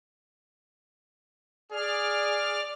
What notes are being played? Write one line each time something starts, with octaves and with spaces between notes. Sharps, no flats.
G#4 D5 F6